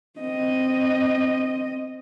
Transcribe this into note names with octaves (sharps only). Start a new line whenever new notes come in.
C4 D#5